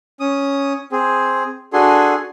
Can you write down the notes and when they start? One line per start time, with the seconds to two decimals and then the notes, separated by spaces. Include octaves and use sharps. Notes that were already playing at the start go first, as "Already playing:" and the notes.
0.20 C#4 D#6
0.92 C4 G#4
1.73 D4 F#4 G#4 A4 G#5 C6